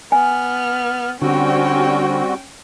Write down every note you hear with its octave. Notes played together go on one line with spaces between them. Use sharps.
B3 G#5 F6
D3 G3 C4 C#4 F#4 G5